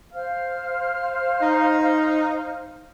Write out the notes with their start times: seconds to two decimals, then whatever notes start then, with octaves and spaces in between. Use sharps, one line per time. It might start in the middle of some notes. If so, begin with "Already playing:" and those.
0.13 C5 F5 F6
1.41 D#4